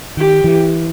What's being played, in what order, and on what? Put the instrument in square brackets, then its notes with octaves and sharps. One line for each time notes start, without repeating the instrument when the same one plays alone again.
[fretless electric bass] D#3 [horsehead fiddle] G4
[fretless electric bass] E3